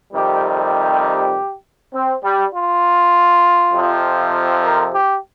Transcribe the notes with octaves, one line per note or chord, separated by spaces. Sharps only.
F2 C3 D#3 G3 G4
G4
C4
G3
F4
F2 C3 F3
A#4
G4